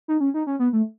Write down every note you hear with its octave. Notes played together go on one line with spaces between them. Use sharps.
D#4
C#4
D#4
C#4
B3
A3